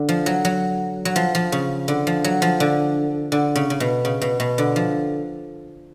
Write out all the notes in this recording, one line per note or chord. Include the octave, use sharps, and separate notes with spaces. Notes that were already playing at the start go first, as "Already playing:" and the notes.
Already playing: D3
F3
F#3
F#3
F#3
F3
F3
C#3
D3
F3
F#3
F3
D3
D3
C#3
C#3
B2
C#3
B2
B2
D3
F3